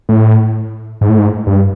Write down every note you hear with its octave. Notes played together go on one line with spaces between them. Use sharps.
A2
G#2
A2
G#2
G2